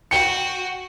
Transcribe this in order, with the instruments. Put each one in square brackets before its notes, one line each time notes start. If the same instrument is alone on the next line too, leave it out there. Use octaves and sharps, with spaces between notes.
[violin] F#4 [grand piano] G5 C#7